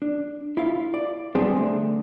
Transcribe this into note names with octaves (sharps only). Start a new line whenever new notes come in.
D4
E4 F4 F5
D5
G3 B3 C4 D4 G4 G#4
D3 A3